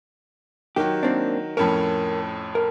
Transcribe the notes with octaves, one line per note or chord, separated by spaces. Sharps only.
D#3 F#3 G4
A#3 C4 D4
F2 A2 C#4 A#4 A5 B5
A#4